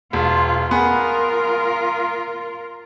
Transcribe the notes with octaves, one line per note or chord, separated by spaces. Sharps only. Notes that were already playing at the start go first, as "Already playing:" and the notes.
E1 F4
B3 F4 G#4 A#4